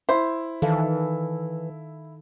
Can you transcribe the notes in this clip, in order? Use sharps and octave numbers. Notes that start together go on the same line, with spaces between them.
E4 C5
D#3 E3 A4 F5